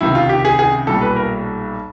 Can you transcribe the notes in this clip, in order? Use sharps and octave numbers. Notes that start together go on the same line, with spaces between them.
C#2 C3 D#3 E4
F4
G4
G#4
G#4
B1 A#2 G3 A4
B4
A#4